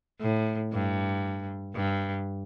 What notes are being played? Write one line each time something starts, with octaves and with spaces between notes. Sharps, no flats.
A2
G2
G2